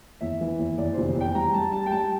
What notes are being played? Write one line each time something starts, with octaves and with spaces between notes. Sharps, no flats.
E2 E5
E3
E2
E2 D5
F1 C5
E2
G5
G3 A#5
G3 A5
G3 A5
G5
G3 A5